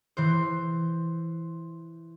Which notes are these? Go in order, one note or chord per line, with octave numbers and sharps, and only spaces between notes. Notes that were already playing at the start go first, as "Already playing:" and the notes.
E3 C5